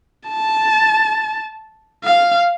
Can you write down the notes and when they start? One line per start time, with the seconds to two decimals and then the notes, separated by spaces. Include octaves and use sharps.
0.29 A5
2.04 F5